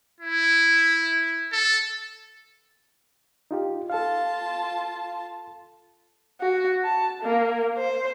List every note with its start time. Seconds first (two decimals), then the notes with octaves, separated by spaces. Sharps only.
0.20 E4
1.52 A4
3.51 D#4 F4 G4
3.90 F4 A4 F5 A5
6.41 F#4
6.84 A5
7.22 A#3
7.78 C5